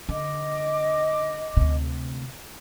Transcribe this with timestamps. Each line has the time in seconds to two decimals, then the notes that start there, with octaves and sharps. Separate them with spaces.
0.09 D3 D#5 D6
1.57 D2 C3